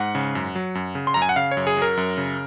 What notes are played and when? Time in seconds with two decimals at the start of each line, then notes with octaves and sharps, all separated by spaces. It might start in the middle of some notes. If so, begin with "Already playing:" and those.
Already playing: G#2 F#5
0.15 C#3
0.35 F#2
0.55 F#3
0.75 F#2
0.95 C#3
1.07 C6
1.14 F#2 A#5
1.22 G#5
1.29 F#5
1.36 C#3 F5
1.51 C#5
1.57 F#2
1.67 G#4
1.77 F#3 A#4
1.97 F#2
2.17 C#3